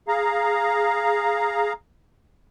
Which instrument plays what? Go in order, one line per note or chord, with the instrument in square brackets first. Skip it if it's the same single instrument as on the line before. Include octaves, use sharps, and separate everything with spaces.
[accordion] G#4 F5 A#5